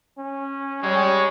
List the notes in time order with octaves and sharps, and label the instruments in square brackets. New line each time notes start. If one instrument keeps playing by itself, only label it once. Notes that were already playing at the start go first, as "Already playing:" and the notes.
[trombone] C#4
[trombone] G3 [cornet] G#3 [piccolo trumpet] C#5